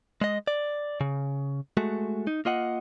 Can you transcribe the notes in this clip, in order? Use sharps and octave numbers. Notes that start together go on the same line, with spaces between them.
G#3 D#5
D5
C#3
G#3 A3 F#4 A4
D#4
A#3 F4 D#5 F#5